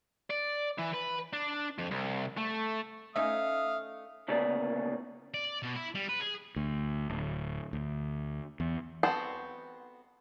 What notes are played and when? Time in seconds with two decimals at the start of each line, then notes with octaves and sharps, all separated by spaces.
0.30 D5
0.79 E3
0.94 B4
1.33 D4
1.78 F2
1.91 C2
2.37 A3
3.16 A3 C#4 D#4 E5 F5 D#6
4.28 D2 A#2 C#3 A#3 B3 D5
5.34 D5
5.63 B2
5.76 E4
5.95 G3
6.09 B4
6.21 G#4
6.56 D2
7.10 D1
7.73 D2
8.60 E2
9.03 B3 C4 F#4 A4 C5